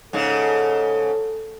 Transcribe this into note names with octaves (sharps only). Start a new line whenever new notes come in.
G#2 C#3 A4